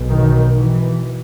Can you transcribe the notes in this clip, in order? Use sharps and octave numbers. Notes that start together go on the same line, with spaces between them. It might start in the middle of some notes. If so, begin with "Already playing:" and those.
Already playing: B1 B2
D#3
E3